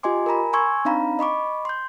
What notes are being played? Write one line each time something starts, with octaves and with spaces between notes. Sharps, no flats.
F4 G4 D#5 G#5 C6 D6
A#4 G#5 A#5 B5
G#5 C6 C#6 E6 G#6
C4 D4 D#4 F5 A#5 B5
D#5 B5 C#6 D6
C6 G6